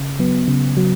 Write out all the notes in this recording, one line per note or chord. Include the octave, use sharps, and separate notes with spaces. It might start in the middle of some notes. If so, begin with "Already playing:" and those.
Already playing: C#3
F#3 B3
C#3
F#3